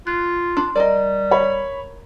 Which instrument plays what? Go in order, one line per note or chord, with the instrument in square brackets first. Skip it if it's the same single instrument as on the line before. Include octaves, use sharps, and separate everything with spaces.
[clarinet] F4 [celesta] F#6
[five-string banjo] D4 [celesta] C6
[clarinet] G3 [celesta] A#4 A#5 [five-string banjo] D5 D#5
[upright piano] C#5 B5